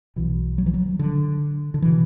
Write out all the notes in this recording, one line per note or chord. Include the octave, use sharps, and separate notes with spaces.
B1 B2 E3
F#3
E3
F#3
D3
D3
B2 E3